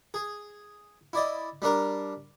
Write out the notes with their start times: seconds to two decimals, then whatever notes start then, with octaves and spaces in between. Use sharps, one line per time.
0.14 G#4
1.13 E4 D5 D#5
1.62 G3 D4 A#4